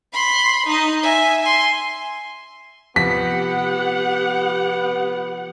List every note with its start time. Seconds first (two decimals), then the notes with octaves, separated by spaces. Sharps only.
0.13 B5 C6
0.66 D#4 D#5
1.03 E5 G#5
1.43 G#5 C6
2.96 C3 F3 B3 G4 F#5 B6